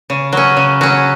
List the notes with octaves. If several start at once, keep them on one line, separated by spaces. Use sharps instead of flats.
C#3
F#3 C#4
C#3
F#3 C#4